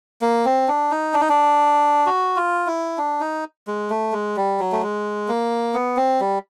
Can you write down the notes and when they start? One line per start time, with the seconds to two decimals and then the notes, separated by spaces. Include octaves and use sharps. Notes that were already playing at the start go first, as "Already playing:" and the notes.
0.21 A#3
0.45 C4
0.68 D4
0.91 D#4
1.14 D4
1.21 D#4
1.29 D4
2.06 F#4
2.36 F4
2.67 E4
2.98 D4
3.20 D#4
3.67 G#3
3.90 A3
4.12 G#3
4.36 G3
4.59 F#3
4.72 A3
4.82 G#3
5.28 A#3
5.74 B3
5.97 C4
6.20 G3